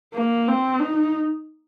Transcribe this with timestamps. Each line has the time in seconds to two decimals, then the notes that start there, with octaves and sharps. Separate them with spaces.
0.14 A#3
0.47 C4
0.80 D#4